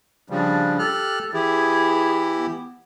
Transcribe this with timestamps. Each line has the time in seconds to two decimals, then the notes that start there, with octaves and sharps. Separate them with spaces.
0.30 C#3 F3 G3 D4
0.79 G4 A4 F6 F#6
1.34 E3 E4 G4 G#4
2.33 B3